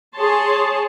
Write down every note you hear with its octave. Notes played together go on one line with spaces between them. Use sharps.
G#4 C#5 A5 C6